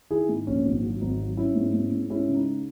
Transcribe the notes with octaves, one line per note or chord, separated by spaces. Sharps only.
D#3 E4 G#4
G#2 D#4
A#1 C#4
G#1
F#3
G#1 D#4
F#3
F#3 C#4 E4
G#2
G#2
G#2
G#3 C#4 E4
C#3
D#4